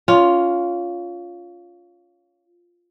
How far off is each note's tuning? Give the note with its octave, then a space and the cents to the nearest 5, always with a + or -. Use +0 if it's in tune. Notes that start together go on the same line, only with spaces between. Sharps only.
C#4 +25 F4 +0